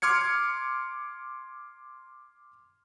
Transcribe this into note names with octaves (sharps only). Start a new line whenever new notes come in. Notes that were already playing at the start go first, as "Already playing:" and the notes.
C6 D6 F6 G#6 C#7